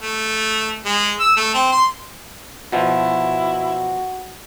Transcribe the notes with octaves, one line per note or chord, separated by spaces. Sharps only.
A3
G#3
E6
A3
C4
C6
B2 F3 E4 F#4